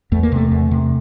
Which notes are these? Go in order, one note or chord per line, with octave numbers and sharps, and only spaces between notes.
E2 A3
A#3
C3 A3
E2
C3